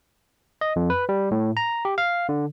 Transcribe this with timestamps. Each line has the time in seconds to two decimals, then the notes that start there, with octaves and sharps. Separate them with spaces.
0.61 D#5
0.76 F2
0.90 B4
1.09 G3
1.31 A2
1.57 A#5
1.85 G4
1.98 F5
2.29 D3